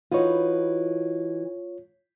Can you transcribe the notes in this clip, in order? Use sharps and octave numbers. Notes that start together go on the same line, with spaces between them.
E3 D#4 F4 F#4 C#5